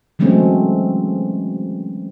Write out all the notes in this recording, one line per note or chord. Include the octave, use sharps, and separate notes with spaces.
E3 F#3 G#3 A3 C4 C#4